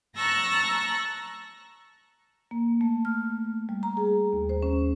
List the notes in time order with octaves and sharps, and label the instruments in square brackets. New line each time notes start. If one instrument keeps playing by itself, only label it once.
[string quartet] A5 A#5 C#6 E6 F#6 A#6
[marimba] A#3
A3
F6
G3
A#5
G#4
D#2
C5
C#4